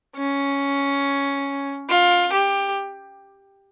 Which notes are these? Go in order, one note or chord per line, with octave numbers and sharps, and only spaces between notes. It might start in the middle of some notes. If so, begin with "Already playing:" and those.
C#4
F4
G4